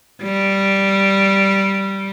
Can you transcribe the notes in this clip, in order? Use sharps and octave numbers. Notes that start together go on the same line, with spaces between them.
G3